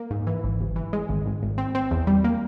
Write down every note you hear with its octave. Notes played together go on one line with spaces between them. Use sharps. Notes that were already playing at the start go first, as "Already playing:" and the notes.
Already playing: A#3
G#2
E3
G#1
G1
E3
G#3
G#1
G#1
G#1
C4
C4
E2
G3
A#3